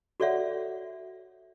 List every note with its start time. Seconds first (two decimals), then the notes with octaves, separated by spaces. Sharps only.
0.20 F#4 A4 C#5 D5 E5 F#5